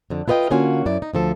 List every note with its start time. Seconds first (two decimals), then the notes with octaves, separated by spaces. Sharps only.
0.10 F2 D3
0.28 E4 F4 B4 D#5 G5
0.51 D3 A#3 C#4 F4 F#4 G#5
0.86 F#2 F#3 E4 D5
1.02 D#4
1.14 D2 F3 A4